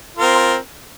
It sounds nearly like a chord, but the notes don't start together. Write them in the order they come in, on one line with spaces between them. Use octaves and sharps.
F4 A#4 C4